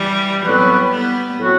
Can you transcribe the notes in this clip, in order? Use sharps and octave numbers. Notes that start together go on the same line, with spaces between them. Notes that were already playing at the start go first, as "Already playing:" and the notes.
Already playing: E3 G3
A2 F#3 G3 B3 C4 F#4 B4
G3 B3
A2 F#3 C4 F#4